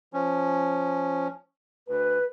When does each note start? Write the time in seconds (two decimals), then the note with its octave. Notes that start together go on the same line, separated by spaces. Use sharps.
0.13 F3 C#4
1.88 D2 B4